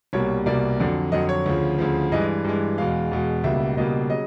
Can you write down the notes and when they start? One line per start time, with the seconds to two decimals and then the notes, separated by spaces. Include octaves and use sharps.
0.13 C2 B2 G3 A#3 C#5
0.46 C2 B2 G3 A#3 D5
0.80 F2 D3 F#3
1.12 F2 D3 F#3 D#5
1.29 C#5
1.46 D2 C#3 F3
1.78 D2 C#3 F3
2.12 G2 E3 G#3 D#5
2.44 G2 E3 G#3
2.78 E2 B2 G#3 F5
3.11 E2 B2 G#3
3.44 C#2 B2 G3 A#3 E5
3.77 C#2 B2 G3 A#3 D#5
4.10 C#3 F#3 D#5